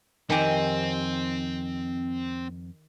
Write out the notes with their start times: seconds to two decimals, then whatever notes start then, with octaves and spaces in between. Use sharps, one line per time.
0.30 F2 D#3 C4 G4 G#5